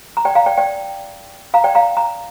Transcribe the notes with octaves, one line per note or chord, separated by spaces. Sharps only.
A#5
D5 G5
F5 A#5
D5 G5
D5 G5
F5 A#5
D5 G5
F5 A#5
A#5